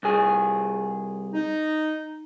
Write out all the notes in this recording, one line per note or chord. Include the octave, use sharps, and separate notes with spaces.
C2 G#4
D#4